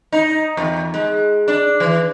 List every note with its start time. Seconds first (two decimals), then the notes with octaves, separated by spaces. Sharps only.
0.12 D#4
0.57 E2
0.94 G#3
1.48 D4
1.80 E3